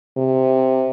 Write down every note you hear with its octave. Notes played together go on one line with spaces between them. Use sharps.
C3